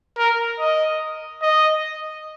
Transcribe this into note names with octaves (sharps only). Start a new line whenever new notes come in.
A#4
D#5
D#5